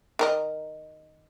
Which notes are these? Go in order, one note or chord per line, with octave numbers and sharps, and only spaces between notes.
D#3 A#4 D#5